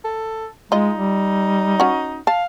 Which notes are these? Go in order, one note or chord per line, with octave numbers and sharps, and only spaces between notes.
A4
G#3 D#4 F4 D#5
G3
C#4 F#4
F5 A5